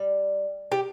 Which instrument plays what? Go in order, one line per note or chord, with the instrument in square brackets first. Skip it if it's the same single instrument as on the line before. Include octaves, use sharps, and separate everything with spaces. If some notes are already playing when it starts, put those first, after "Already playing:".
Already playing: [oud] G3
[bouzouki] G4